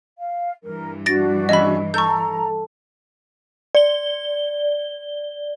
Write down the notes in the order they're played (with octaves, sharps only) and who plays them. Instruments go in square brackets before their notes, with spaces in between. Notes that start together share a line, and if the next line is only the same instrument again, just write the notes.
[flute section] F5
[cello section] G2 E3 [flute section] A#4
[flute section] D4 F#4 [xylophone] A6 A#6 D7
[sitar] E2 C#4 E5 [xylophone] D#5 B5
[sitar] A4 [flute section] A#5 [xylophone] C#6 G6
[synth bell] D5 G7